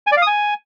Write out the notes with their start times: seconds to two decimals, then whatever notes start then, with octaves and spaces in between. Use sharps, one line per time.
0.07 G#5
0.12 D5
0.17 F5
0.22 D#6
0.27 G#5